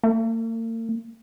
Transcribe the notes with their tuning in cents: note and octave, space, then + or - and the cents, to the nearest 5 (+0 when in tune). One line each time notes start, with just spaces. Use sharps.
A#3 -45